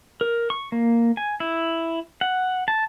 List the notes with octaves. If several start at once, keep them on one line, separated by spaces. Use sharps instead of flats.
A#4
C#6
A#3
G#5
E4
F#5
A5